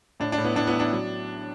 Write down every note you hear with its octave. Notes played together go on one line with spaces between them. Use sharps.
A2 D4
D4
A2
B3 E4
A2 D4
B3 E4
A1
D4
F#3